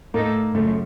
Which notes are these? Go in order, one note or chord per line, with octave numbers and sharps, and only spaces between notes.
A2 A3 A#3 D#4 A4
F#2 C#3 F3 A3